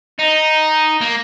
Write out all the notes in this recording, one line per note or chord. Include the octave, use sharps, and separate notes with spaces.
D#4
A#3